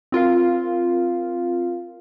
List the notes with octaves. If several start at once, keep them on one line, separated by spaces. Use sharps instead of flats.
C4 F4 A#4 F5